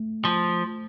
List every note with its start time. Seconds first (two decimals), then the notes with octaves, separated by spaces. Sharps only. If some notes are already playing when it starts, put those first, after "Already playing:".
Already playing: A3
0.25 F3